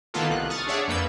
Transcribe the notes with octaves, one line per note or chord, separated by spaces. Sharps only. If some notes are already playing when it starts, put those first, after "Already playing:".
D#3 A#3 B3 F4 A4
C2 F#6
C#6 D#6 F6 A6
D4 G#4 C#5 D5 E5 F#5
F2 A#3 B4 E6 G6